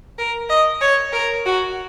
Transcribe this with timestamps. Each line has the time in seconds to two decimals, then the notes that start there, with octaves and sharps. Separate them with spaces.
0.18 A#4
0.49 D#5
0.81 C#5
1.13 A#4
1.46 F#4